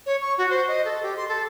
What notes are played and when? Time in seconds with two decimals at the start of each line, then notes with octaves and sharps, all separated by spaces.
0.06 C#5
0.21 C#6
0.38 F#4
0.50 C5
0.68 D#5
0.85 A4
1.03 G4
1.16 C6
1.28 A4